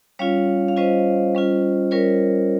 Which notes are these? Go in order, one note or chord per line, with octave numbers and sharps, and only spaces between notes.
G3 C#4 F4 C#5 F5
F5
G3 C#4 F4 C5 D#5
G3 C#4 F4
G3 C#4 F4 A#4 C#5